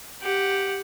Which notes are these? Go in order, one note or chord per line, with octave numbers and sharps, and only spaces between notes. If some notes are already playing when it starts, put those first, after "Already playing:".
G4 F#5